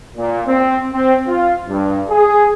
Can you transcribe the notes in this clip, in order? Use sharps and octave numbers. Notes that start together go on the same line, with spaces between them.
A#2
C4
C4
F4
G2
G#4